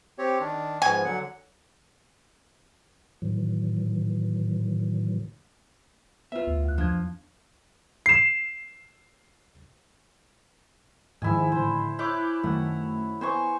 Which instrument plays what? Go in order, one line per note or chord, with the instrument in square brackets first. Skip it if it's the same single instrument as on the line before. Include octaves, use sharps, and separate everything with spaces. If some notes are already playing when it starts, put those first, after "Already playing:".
[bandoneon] C4 G4 C#5
D#3 D4
[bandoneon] G#2 F3 B3 [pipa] G#5
[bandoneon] D3 F#3 F#5
[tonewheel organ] A2 D#3 E3 F#3
[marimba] B3 B4 [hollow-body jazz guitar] F4 E5
[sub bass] D2
[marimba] F2 F#6
[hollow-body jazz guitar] F3 [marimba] D4 G#6
[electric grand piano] C7 E7
[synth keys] G#2 D#3 F3 [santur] E4 G#5
[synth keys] A2 D3 [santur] C5
[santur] E4 C#5 [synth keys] D6 F#6 G6
[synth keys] F#2 D#3 A3 [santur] F#5
[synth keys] B3 [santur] C5 G#5 C#6